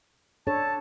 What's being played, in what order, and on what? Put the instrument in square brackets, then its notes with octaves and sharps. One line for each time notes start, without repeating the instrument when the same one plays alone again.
[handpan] D4 A4 C#5 [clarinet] A5